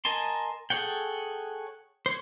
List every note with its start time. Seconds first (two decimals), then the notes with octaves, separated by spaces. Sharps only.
0.05 A#4 D#5 G#5 A5 C6
0.70 G#4 A4 C#5 F#5 G5
2.06 C5 C#5